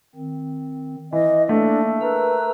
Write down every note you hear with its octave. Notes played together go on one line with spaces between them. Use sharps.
D#3 C4
E3 D#5
A3 A#3 D4 A4
A#4 B4 A#5 E6